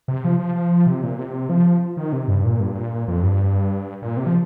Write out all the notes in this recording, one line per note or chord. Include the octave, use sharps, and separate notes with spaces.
C3
F3
F3
F3
C3
A#2
C3
F3
D#3
C3
G2
A#2
G2
A#2
F2
G2
A#2
C3
F3